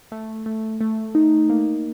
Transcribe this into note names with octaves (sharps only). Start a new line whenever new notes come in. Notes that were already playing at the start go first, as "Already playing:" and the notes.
A3
A3
A3
D#4
A#3